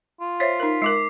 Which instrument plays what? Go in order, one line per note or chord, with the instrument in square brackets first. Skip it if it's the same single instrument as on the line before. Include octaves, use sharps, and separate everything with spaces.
[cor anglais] F4
[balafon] C5 C#5 E5 [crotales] B6 C7
[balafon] D#4 A#4
[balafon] G#3 A#4 [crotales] D6 C7